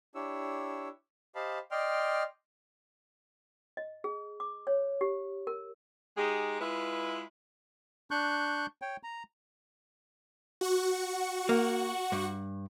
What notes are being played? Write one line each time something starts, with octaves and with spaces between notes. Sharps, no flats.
D4 E4 G4 C#5 E6
G4 C5 D#5 F5 A5 B5
D5 D#5 G5 C6 F6
D#5
G#4
D6
C#5
G4
A#4
G#3 D#4 G4 G#4
G#3 E4 F4 B4
D4 C#6 F#6 G6
C#5 G5
A#5
F#4 F#5 C#6
A#3
G2